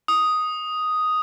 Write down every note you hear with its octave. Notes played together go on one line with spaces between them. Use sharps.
D#6